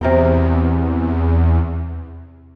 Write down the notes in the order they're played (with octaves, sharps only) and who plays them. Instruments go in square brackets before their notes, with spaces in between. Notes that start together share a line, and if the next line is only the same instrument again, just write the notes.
[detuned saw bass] E2 [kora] C3 A#4 G5